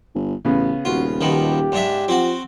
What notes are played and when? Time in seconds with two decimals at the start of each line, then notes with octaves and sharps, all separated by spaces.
0.15 G1
0.45 A1 C#3 B3
0.85 D#1 F4 F#4
1.21 B2 D#3 F3 G4
1.72 G#2 D4 E5
2.08 F3 C4 F#4